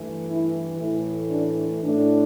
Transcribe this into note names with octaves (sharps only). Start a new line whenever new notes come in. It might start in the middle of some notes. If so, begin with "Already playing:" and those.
Already playing: G2 E3 A3
E4
A2 E3 A3 E4
D4
A2 A3 D4